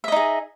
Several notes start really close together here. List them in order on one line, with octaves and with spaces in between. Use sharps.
E5 D#5 D#4 G#4